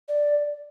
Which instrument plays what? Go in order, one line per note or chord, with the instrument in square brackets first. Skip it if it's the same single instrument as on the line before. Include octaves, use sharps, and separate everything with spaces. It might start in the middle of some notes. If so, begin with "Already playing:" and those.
[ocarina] D5